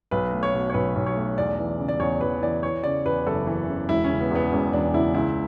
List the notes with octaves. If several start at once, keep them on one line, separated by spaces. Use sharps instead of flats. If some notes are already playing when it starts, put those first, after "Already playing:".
B1 B4
A3
C#5
B2
C#5
B1 B4
B1
C#5
A3
E2 D5
E3
C#3
D5
E2 C#5
E2 B4
E3 D5
E3 C#5
C#3 D5
E2 B4
F#1 A4
E3
C#3
E1 E4
C#4
C#3
B3
E2 B3
E1 C#4
E1 D4
C#3 E4
C#2 E4